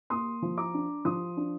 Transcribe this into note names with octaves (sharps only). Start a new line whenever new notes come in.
A#3 C6 D#6
F3
A#5 D6
D4
F3 C6 D#6
D4